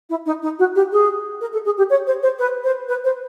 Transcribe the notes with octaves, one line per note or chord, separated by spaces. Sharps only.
E4
D#4
D#4
F#4
G4
G#4
A#4
A4
G#4
G4
C#5
C5
C5
B4
C5
B4
C5